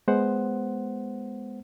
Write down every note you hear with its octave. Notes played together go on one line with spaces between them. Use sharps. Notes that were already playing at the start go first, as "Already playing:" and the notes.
G#3 B3 C5 F#5